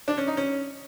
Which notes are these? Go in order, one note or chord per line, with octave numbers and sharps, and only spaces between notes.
D4
C#4
D#4
C#4